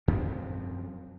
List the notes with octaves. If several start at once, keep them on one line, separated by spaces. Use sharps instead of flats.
F#2 F3 C4